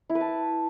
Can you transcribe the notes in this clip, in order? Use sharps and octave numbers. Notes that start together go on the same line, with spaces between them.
E4
B4
A5